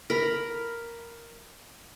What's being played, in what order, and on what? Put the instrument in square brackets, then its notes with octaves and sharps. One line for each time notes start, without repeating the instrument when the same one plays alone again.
[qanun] A#4 B5